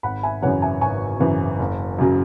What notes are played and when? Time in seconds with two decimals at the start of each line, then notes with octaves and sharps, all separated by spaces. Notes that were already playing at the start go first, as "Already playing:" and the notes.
0.03 G#1 F#5 B5
0.23 E5 G#5
0.42 F#2 C#3 E3 C#5 F#5
0.62 E5 G#5
0.81 G#1 G#5 C#6
1.20 F#2 C#3 E3
1.59 F#1
1.98 F#2 C#3 F#3